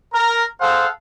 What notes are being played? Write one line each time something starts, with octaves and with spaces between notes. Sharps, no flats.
A#4
G#4 A4 C5 F5 F#5